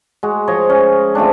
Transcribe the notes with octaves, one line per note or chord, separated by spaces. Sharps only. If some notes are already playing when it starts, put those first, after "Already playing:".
G#3 F#4
F3 C#5 D#5
C#4
F3 A3 C4 D4